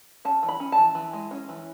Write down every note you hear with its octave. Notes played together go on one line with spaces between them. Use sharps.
C#4 A5
E3
B5
C#4
A5
E3
E3
G#3
C#4
E3